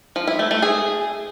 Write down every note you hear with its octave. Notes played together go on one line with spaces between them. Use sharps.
F3
E4
A3
A3
G#4